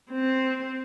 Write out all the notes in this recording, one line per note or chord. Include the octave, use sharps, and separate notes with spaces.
C4